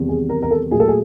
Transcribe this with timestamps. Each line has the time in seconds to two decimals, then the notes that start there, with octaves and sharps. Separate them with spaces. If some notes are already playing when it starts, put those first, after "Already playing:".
Already playing: E2 C3 D#3 G3
0.09 G#4
0.29 A#4
0.42 A#4
0.51 A4
0.71 A#2 F#3 A3 G#4
0.80 A4
0.88 G#4